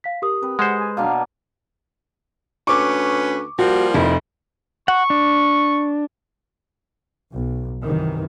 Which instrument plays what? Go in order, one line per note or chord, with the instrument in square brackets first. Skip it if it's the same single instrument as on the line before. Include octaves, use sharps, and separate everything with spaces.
[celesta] F5 B6
G4 A#4 D#6
[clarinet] C4 [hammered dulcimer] B4
[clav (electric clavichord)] G#3 C5 [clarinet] F#5
[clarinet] G#5
[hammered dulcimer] B2 A#3 D4 [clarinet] F5
[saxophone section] D2 C#4 B4 [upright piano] C#6 D6
[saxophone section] F3 G3 A#3 [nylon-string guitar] F#4
[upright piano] F1 [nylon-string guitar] E4
[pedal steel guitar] F#5 [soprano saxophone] C#6
[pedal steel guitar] D4
[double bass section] B1
F#2 C3 D#3 E3